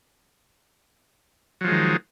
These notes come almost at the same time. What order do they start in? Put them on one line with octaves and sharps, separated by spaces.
F#3 F3 G#3 D#3